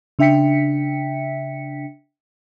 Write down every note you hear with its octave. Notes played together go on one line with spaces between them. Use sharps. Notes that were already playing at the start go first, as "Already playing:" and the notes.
C#3 D4 E5 G5 B6 C#7